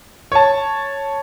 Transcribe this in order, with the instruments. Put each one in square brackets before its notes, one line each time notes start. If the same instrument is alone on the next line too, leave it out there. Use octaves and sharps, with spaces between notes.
[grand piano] C#5 A5